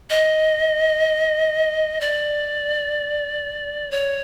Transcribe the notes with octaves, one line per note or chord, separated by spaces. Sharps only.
D#5
D5
C#5